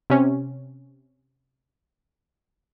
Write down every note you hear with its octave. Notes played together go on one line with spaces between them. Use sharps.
C3 C#4